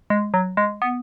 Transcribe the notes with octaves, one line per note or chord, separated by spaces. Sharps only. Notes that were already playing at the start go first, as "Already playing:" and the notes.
G#3
F#3
G#3
B3